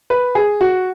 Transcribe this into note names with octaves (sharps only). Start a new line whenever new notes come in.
B4
G#4
F#4